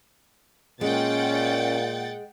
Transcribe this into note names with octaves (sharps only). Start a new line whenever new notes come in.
A#2 G#3 C#4 F#5 G5 A6